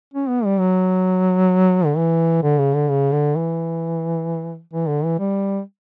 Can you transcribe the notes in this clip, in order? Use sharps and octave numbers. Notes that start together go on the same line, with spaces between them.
C#4
B3
G3
F#3
D3
E3
D3
C#3
D3
C#3
D3
E3
E3
D3
E3
G3